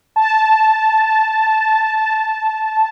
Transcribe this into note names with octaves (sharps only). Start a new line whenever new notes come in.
A5
A5